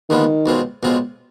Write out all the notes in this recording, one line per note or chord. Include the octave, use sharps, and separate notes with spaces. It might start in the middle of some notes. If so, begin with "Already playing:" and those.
D#2 D3 D#3 G#3 B3 F4
B1 B2 G#3 C4 F4
B1 B2 G#3 C4 F4